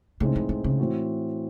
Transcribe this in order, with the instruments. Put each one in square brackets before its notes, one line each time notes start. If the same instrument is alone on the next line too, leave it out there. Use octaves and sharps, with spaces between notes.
[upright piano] A2 G#3 C4 D#4 [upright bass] C#3
[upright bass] E3
D#3
C#3
[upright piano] A2 E3 C4 F#4